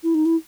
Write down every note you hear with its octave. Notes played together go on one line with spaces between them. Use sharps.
E4
D#4
E4